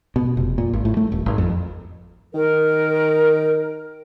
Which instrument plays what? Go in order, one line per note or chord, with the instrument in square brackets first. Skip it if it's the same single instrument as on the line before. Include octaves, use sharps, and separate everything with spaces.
[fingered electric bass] B2
F1
A#2
G#1
A2
A3
D#1
G#1
F2
[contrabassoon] D#3 [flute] A#4